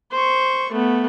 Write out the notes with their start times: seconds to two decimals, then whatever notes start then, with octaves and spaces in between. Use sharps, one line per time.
0.12 C5 C#6
0.72 A3 B3